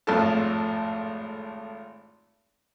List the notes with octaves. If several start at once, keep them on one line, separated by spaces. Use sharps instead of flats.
G#1 F2 A2 F4 A4 A5